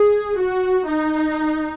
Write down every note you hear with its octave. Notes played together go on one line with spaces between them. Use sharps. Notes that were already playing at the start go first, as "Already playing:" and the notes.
Already playing: G#4
F#4
D#4